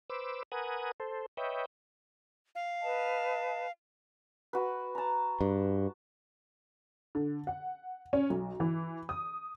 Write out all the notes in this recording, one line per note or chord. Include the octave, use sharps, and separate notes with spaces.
B4 C5 D6 E6
A#4 B4 F#5 G#5 D#6
A4 C5
B4 C#5 D#5 E5 G5
F5
B4 D#5 A5
F#4 B4
A5 A#5
G2
D3
F#5
C#4
B1
E3
D#6